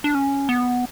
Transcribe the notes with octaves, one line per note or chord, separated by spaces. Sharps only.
D4
C#4
B3